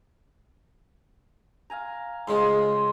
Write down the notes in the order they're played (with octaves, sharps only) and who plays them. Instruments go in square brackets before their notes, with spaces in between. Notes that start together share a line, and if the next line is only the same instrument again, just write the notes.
[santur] F5 G#5 A#5
[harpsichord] G#2 C#3 G#3 [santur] F4 C6